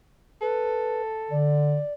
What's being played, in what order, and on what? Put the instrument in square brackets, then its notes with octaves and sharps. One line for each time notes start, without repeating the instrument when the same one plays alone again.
[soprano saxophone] A4 [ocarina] B4
[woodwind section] D3 [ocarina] D5